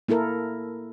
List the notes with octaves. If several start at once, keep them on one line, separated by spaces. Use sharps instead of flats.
A#3 E4 A4 A#4